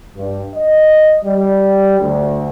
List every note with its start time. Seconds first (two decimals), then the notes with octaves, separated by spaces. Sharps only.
0.16 G2
0.54 D#5
1.24 G3
1.99 D2